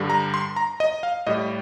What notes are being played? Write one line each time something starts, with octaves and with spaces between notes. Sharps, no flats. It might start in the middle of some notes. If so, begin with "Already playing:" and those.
Already playing: G2 D3 G3
A#5
C6
A#5
D#5
F5
A2 G3 D#5